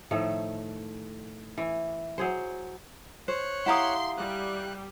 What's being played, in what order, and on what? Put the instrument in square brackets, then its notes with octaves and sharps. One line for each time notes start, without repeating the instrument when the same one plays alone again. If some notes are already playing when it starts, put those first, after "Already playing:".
[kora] A2 D#3 F3 A3
E3
F#3 G#4 C5
[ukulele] C5 [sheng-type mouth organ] C#5 F#6
[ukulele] E4 G4 F5 [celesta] F#5 A#5 D#6 [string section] C6
[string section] G3 [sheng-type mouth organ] F#6